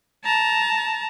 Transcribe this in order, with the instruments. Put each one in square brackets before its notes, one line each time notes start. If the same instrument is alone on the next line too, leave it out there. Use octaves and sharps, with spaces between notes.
[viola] A5 A#5